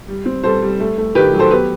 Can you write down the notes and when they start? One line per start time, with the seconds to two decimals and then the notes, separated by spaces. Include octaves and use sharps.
0.08 G3
0.26 C4
0.43 G3 A4 C5
0.62 G3
0.80 A3
0.98 A3
1.15 D#3 G4 B4
1.33 F#3
1.39 A4 C5
1.51 B3 G4 B4